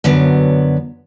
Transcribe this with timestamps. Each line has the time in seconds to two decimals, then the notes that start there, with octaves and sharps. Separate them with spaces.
0.04 F#2 D3 F#3 B3